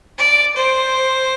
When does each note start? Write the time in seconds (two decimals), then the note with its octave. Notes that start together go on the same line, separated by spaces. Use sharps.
0.18 D5
0.56 C5